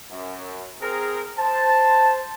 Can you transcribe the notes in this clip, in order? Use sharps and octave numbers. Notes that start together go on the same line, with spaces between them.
F#2
C4 G#4 A#4
C5 A5